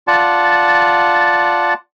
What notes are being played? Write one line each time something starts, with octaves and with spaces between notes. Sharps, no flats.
F4 D5 F#5 A5